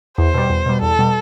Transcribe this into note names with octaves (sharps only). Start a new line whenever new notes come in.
E2 C5
B2 G3
E2
B2 G3
E2 A4
B2 G3